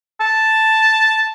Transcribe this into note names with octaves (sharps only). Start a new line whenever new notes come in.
A5